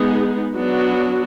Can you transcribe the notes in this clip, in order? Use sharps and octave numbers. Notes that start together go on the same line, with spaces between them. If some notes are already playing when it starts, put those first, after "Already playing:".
Already playing: G#3 B3 D#4 G#4
F#3 B3 D4 F#4